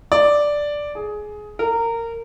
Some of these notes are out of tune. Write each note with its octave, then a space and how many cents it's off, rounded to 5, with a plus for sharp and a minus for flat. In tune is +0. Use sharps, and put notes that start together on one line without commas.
D5 +0
G#4 +15
A#4 -20